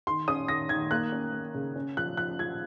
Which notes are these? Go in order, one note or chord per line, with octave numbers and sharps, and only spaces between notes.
D#3 C6
C#4 D#6
D#3 A#6
D#3 G#6
A#3 F#6
C#4
A#3
C#3
C#4
F3 F#6
F3 F#6
F3 G#6